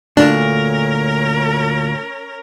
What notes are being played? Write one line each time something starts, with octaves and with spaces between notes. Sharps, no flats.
D2 A#2 A3 C#4 D4 A#4